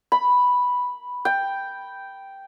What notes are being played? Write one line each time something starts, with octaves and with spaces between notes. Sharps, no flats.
B5
G5